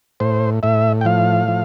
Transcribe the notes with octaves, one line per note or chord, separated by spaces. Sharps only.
A2 C5
A2 E5
G5
F3 F5
F3